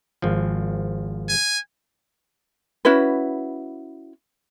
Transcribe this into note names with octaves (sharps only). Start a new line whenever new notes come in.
G#1 F3
G#5
C#4 E4 F#4 B4